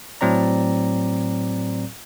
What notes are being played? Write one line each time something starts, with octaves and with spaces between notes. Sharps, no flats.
A2 F#3 C4 D5 A#5